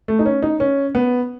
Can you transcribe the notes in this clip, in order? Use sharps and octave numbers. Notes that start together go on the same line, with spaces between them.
A3
D#4
C#4
D#4
C#4
B3